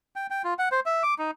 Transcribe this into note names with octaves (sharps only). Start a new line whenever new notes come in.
G5
G5
F4
F#5
C5
E5
D6
D#4